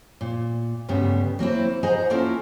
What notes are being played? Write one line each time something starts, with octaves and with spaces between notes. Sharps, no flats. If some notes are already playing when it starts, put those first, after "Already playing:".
A#2
D2 G2 C#3 G3 B3
F#3 A#3 C4 E4
G#4 C5 D#5 F#5 G#5 A#5
A#3 C#4 E4 F4 A4 A#4